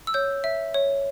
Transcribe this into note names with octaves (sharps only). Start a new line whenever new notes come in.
E6
C#5 G6
E5
C#5